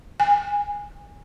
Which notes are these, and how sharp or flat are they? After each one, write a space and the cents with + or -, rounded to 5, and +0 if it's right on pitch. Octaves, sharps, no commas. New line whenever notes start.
G#5 -15